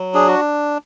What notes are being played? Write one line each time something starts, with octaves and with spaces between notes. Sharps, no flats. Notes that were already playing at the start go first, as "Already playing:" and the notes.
Already playing: F#3
D4 G#4
F#4